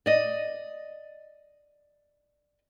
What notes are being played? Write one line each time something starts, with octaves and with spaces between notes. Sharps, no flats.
D5 D#5